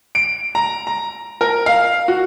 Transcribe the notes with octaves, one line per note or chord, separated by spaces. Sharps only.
D7
A#5
A#5
A#4
F5
F#4